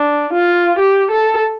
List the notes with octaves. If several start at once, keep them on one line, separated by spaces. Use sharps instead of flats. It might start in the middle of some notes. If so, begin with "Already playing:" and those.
Already playing: D4
F4
G4
A4